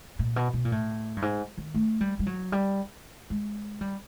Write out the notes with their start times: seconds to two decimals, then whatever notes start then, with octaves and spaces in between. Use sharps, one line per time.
0.19 A#2
0.36 B2
0.53 B2
0.65 A#2
0.72 A2
1.17 G2
1.22 G#2
1.58 D#3
1.74 A3
2.01 G3
2.19 G3
2.26 F#3
2.52 G3
3.30 G#3
3.81 G3